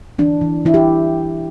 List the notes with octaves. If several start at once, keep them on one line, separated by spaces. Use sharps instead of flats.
E3 D4
E3
E3 E4
G4